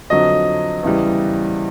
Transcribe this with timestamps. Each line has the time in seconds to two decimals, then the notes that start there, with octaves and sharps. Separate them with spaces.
0.10 F2 D3 F#3 D#5
0.83 E2 C#3 E3 G3